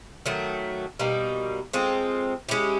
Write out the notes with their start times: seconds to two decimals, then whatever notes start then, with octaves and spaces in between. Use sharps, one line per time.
0.26 D#3 F#3 A3
0.99 B2 G3 A#3 D#4
1.73 G#3 C4 F4 A4
2.49 G#3 C#4 E4 G4